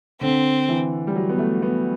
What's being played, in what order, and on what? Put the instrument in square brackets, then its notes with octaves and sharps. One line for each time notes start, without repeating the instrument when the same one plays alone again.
[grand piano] D3 [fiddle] C4
[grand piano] E3
G3
F#3
B3
A3
B3